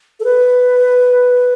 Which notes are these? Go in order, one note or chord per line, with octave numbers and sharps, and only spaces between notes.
A4
B4